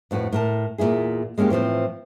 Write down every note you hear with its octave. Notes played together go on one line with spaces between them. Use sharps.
F2 A2 F#4 B4
A2 A#4 A5
E2 A#2 F#3 E4 G#4
G#3 A#3 C#4 F4 G4
A2 E3 F3 C4